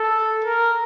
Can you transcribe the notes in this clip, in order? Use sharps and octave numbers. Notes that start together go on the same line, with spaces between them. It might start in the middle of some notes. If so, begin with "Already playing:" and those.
Already playing: A4
A#4